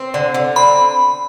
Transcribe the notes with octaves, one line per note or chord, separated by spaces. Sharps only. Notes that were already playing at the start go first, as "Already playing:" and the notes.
Already playing: C4
D3
D3
C4 B5